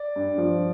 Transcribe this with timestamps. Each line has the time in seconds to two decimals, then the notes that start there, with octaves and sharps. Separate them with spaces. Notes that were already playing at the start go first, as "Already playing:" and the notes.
Already playing: D5
0.16 G2
0.38 F3